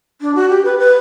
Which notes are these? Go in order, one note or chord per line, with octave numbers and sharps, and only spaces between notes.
D4
F#4
G4
B4
B4